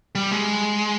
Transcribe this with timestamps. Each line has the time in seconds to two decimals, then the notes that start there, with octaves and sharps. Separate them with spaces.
0.15 G3
0.31 G#3